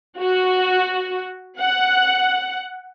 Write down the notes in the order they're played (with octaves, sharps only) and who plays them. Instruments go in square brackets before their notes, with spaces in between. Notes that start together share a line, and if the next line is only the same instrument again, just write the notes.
[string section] F#4
F#5